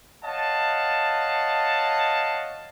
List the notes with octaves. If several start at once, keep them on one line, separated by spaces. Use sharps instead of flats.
C#5 D#5 F5 F#5 A5